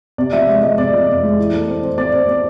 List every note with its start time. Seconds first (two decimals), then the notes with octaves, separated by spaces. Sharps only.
0.18 C3 D5
0.33 F3 E5
0.48 G#3 E5
0.63 G#3 D#5
0.78 C3 D5
0.93 F3
1.08 F2
1.23 G#3
1.38 E3
1.53 A3
1.68 C4
1.83 C4
1.98 C4 D5
2.12 C4
2.28 C4